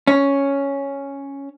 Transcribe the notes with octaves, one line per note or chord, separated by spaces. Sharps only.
C#4